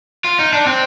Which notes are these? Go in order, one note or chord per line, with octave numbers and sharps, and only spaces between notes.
F4
D#4
D4
C4